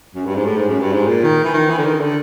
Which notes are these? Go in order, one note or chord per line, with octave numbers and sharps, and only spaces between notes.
F#2
G2
G#2
A2
G#2
F#2
G2
G#2
A#2
D#3
E3
D#3
E3
D3
D#3
D3